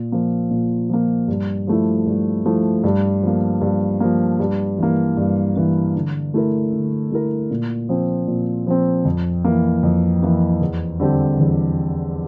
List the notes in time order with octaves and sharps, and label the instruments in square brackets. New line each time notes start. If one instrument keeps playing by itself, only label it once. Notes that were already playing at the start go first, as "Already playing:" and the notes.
Already playing: [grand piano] A#2
F3 A#3
A#2
F3 A#3
G2
F3 A3 E4
G2
F3 A3 E4
G2
F3 A#3
G2
F3 A#3
G2
E3 A#3
G2
E3 A#3
D3
A3 E4 A#4
D3
A3 E4 A#4
A#2
F3 C4
A#2
F3 C4
F2
E3 A#3
F2
E3 A#3
E2
D3 G3 C4 G4
E2